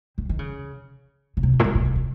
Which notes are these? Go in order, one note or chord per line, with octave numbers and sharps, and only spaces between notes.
D#3
D#3
C#3
C#3
C3
F#2
A#2
G#2
A#2
C#3
C#3